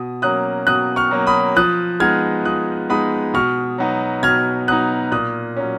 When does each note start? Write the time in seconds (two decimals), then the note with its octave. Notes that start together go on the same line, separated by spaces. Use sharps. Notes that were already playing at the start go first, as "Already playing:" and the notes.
Already playing: B2 D#6
0.22 F#3 A#3 C#4 D#6 F#6
0.67 B2 D#6 F#6
0.96 C#6 F6
1.11 F#3 A#3 C#4
1.27 B5 D#6
1.56 F3 D#6 F#6
2.00 G#3 B3 D#4 F6 G#6
2.45 F3 D#6 F#6
2.90 G#3 B3 D#4 B5 D#6
3.34 B2 C#6 F6
3.78 F#3 B3 D#4
4.23 B2 F6 G#6
4.68 F#3 B3 D#4 D#6 F#6
5.12 A#2 D#6 F#6
5.57 F#3 C#4